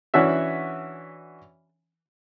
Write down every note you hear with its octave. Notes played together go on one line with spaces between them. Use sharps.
E3 C#4 D4 F#4 E5